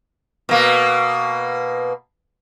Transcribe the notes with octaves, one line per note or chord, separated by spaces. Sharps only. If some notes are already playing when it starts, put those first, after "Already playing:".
B2 A#3